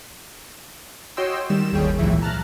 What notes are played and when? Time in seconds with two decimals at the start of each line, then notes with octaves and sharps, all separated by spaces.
1.17 F#4 C#5 D#5 G5 C6 E6
1.50 D#3 G3 E7
1.72 G1 D#2 G3 G#4 C#5 G5
1.99 G#1 C#2 A#2 E3 F#3 E5
2.21 A5 A#5 F6 F#6 A6